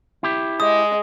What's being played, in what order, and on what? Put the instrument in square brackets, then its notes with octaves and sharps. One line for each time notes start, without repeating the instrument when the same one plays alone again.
[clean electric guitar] E4 G4
[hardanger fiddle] G#3 [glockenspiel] D#6